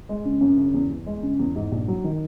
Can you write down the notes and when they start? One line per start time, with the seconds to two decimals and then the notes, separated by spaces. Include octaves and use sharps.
0.09 G#3
0.25 C#3
0.41 F#2
0.58 C#3
0.74 E2
0.90 E2
1.06 G#3
1.23 C#3
1.39 E2
1.56 G#2
1.72 A#1
1.88 F#3
2.04 D#3